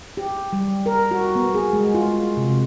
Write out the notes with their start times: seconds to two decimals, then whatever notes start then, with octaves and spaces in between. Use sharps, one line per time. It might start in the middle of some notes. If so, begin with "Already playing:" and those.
0.17 G4
0.53 G3
0.86 A#4
1.11 F#4
1.35 B3
1.54 G#4
1.73 G#3
1.94 F4
2.37 C3